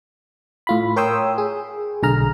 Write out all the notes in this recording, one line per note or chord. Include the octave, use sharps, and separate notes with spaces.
A2 F4 B5
A#4 C#5 G5 C6 D#6 E6
G#4
B1 D3 G#4 A#5 F6